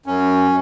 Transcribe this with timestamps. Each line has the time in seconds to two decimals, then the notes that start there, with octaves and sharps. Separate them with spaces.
0.06 F#2 C#4